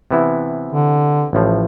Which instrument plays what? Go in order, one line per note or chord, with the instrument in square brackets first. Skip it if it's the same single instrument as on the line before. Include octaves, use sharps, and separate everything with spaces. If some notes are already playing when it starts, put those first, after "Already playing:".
[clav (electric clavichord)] C3 E3 B3 E4
[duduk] D3
[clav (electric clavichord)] A1 A2 F3